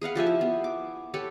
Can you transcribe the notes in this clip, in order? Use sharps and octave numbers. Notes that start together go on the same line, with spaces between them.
G#4 B4 F5 F#5
F3 G4 E5 G#5
E4
B3
D6
G4 A4 B4 C#5